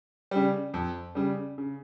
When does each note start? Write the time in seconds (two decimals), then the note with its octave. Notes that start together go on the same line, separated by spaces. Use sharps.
0.31 C#3 G3
0.74 F2
1.15 C#3 G3
1.58 C#3